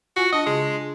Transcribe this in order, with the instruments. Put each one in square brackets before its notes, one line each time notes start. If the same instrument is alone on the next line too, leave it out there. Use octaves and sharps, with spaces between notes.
[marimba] F4 G#5 [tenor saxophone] F#4
[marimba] D4 A5 [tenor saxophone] D#5
[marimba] C#3 C6 [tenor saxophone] G#3